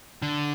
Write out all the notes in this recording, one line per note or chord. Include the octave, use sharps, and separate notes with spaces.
D3